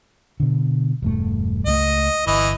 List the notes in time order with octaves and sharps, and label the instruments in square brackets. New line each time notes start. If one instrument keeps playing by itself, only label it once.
[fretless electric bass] B2 D3
E1 G2 A3
[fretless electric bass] C#2 G#3 A3 [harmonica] D#5
[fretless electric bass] G1 [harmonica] E3 D#5